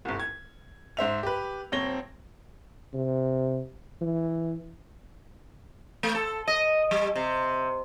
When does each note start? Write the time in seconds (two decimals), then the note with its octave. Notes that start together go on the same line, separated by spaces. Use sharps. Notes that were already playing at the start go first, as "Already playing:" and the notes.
0.05 G1 C2
0.20 G#6
0.97 G#2 C5 E5 F7
1.23 G4 B4
1.72 D#1 C4 C#5 A#6 G7
2.94 C3
4.01 E3
6.03 A3
6.15 A4
6.47 D#5
6.91 G3
7.16 C3